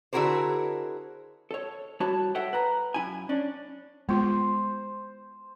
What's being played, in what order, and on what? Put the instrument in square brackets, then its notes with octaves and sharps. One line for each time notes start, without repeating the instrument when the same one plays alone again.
[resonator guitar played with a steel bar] D3 E4 F#4 G#4 A#4 C5
[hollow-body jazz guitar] A4 C#5
G3 E4 F#4 C#5 A5
A4 C#5 E5 F#5 G5
B4 A#5
F#2 E4 G#5
C#4 D4
[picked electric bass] G#3 [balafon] B3 F4 [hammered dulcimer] C5